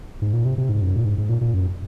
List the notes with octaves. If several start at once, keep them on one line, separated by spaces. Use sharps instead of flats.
G#2
A#2
C3
C3
G#2
F#2
A#2
G#2
G#2
A#2
A#2
F#2